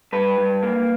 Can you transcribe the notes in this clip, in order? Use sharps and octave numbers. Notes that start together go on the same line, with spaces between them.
G2 B4
G2
A#3